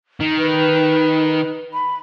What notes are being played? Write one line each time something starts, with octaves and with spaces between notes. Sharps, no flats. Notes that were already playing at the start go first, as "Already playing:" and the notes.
D#3
B4
B5